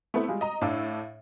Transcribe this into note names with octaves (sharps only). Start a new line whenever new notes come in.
A3 B3 C4 E4
G3 G#3 F4
D#5 A#5
A2 D4 F5 E6